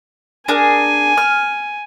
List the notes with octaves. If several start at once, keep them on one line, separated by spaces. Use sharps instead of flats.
D4 G#4 A#4 G#5
F6